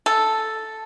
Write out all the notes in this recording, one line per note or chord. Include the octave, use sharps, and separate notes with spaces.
A4